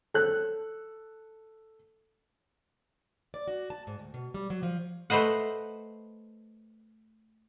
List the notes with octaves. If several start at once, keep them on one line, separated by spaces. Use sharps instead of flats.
A4 F#6
D5
F#4
A5
G#2
D2
B2
G3
F#3
F3
A3 B4 C5 D#5 F#5